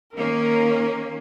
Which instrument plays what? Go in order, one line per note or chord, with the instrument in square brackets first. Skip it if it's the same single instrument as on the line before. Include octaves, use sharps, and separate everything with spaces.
[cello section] D#3 A#3 C#4 [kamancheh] A#4